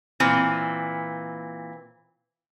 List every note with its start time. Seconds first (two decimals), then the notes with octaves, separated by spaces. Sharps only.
0.20 A#2 E3 C4